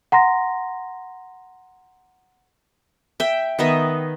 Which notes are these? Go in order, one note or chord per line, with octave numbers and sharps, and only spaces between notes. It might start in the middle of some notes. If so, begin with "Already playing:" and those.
F#5 A#5 C6 A#6
E5 G5
D#3 B3 D#5 E5